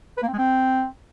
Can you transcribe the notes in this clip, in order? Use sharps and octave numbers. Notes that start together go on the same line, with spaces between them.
B4
A#3
C4
G#3
C4